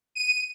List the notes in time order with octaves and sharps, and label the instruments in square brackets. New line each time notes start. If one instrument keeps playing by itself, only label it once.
[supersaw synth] D#7